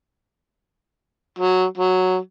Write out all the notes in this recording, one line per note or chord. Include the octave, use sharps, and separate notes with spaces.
F#3
F#3